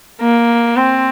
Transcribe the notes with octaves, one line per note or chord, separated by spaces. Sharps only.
A#3
C4